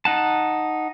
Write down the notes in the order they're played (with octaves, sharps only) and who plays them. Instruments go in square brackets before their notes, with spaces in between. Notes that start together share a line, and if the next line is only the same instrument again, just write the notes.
[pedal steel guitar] D#4 F#5 A5